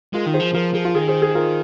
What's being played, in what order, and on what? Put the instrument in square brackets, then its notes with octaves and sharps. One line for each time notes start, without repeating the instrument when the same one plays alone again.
[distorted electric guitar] G#3 [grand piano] F4 A#4
[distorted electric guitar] D#3
[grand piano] G#4 C5
[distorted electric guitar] F3
[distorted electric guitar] F3 [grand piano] F4 A#4
[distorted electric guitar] F3 [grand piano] G#4
[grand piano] F4
[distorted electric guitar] D#3 [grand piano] G#4
[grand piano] G#4 C5
G#4
F4 A#4